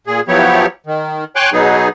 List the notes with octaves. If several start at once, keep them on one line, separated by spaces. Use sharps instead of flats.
A#2 G#4
F3 F#3 B3 E4 G4 C#5
D#3
C#5 G5 G#5 C6 D6 F#6
B2 F#3 B3 D#4 G#4